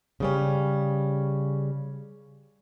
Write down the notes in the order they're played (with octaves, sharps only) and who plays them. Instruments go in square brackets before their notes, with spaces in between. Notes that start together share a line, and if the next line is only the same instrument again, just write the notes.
[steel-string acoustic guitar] C#3 G3 C#4